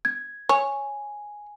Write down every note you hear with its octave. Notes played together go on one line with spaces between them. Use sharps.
G#6
C#5 G#5